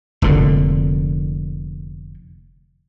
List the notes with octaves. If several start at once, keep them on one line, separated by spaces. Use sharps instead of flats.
F1 A#2 D3